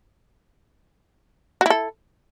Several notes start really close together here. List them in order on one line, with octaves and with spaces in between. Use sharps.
F#4 E4 A4